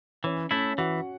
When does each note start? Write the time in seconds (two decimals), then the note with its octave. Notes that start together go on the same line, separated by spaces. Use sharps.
0.24 E3 C#4 C#5
0.51 A3 C#4 E4 C#5
0.78 E3 F#4 F#5